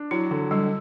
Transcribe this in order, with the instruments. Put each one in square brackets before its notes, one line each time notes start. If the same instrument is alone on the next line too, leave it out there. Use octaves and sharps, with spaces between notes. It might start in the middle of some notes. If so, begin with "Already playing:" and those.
Already playing: [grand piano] D4
[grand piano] F#3 [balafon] E4
[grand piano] D3
[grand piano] D3 [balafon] G3